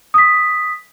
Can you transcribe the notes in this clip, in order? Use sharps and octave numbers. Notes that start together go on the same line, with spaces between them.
D#6 B6